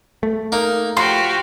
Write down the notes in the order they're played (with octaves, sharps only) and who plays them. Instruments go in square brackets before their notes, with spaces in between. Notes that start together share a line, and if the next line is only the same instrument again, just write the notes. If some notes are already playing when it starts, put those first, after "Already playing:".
[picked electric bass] A3
[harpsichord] A#3 D#4
[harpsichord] F3 [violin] F#4 G4 [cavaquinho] C6